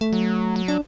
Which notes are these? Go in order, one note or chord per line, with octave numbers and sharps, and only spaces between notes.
A3
F#3
F#3
D4